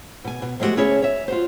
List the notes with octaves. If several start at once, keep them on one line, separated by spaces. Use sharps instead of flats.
B2 G#5
B2
F3 G#3 A3 C4 F#4 G4
D2 C#4 E4 G#4 C#5 E5
C#5 E5
F4 F#4 C5